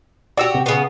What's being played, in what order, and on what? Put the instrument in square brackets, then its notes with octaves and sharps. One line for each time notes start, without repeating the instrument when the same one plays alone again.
[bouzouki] F#4 G4 [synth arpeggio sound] D5 E6
[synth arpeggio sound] C3
[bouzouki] C#3 B3